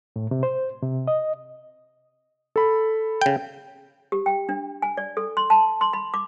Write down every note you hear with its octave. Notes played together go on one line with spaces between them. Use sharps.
A2
C3
C5
C3
D#5
A4 B5
C#3 G5
G4
G5
D4
G#5
D5
A4
C6
A5
C6
B5
D6